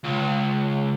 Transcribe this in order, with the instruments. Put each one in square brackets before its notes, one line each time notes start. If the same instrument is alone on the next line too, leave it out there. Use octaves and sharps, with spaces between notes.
[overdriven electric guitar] C#2